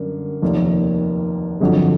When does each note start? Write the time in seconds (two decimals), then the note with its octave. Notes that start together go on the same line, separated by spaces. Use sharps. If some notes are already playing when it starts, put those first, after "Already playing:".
Already playing: F#2 D3 G3 A#3
0.42 F1 D#2 D#3
1.60 G1 F2 D3 F#3